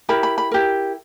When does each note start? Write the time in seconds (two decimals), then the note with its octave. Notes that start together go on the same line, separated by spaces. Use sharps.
0.09 E4 G4 A#4 B5
0.23 B5
0.38 B5
0.51 E4 G4 A#4